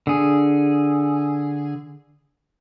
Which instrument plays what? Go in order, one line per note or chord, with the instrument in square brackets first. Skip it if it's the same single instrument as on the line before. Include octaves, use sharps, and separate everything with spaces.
[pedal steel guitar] D3 G#4